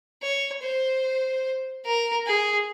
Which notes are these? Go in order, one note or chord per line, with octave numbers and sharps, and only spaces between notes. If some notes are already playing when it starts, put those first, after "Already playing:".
C#5
C5
A#4
G#4